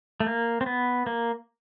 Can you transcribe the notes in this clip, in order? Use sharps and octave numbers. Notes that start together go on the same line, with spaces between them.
A3
A#3
C4
B3
A#3